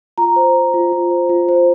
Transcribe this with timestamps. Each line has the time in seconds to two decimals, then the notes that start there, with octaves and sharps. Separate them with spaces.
0.18 F4 A#5
0.36 C5
0.56 C5
0.74 F4
0.92 F4
1.10 C5
1.29 F4
1.49 C5